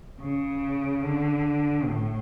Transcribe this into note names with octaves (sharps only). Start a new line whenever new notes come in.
C#3
D3
A2